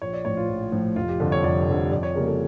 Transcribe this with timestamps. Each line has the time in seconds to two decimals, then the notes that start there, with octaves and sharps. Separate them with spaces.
0.02 A#1 C#5
0.13 D5
0.25 A2 F3 C#5
0.37 F4
0.49 A#1
0.72 A2 F3
0.96 F1 F4
1.08 G4
1.20 F2 D3 G3 A4
1.32 C#5
1.44 F1 D5
1.68 F2 D3 G3
1.91 F2 D5
2.03 C#5
2.15 C#3 G3 A#3 A#4
2.27 A4